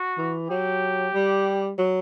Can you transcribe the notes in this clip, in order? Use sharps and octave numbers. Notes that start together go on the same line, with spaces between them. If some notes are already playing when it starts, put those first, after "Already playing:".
Already playing: F#4
E3
F#3 G4
G3
F#3